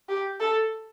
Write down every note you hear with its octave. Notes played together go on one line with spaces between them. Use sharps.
G4
A4